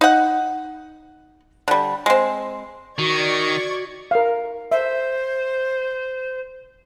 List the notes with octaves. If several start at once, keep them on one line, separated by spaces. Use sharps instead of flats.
D#4 F#5
D3 G3
G#3 C4
D#3 F#4 D5 C#6 G#6
A#4 F5
C5 E5